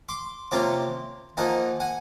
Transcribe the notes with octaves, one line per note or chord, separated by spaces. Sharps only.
C6 D6
C3 F3 A#3 C#4 C6 D6
F3 A#3 D#4 F#5 G#5
F#5 G#5